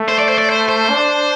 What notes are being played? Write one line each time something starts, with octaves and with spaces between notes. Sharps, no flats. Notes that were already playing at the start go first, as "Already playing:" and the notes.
Already playing: A3
C5
D5
C5
D5
C5
C5
D4